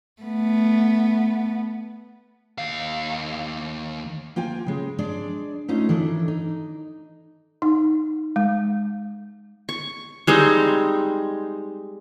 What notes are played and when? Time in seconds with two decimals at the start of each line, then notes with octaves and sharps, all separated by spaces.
0.22 A3 B3
2.58 D#2 F5
4.36 A#3 F4 G5 G#5
4.67 C#3 G#3
4.99 G#3 D4 D5
5.68 A3 C#4 D#4 F4
5.89 D#3 E3 D4 A4
6.28 D#4
7.62 D#4
8.36 G#3
9.69 C#6
10.27 G3 G#3 C4 D#4